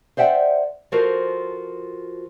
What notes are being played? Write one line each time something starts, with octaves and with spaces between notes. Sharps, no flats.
C5 D5 E5 F#5 G5
F3 F4 F#4 A4 A#4 C5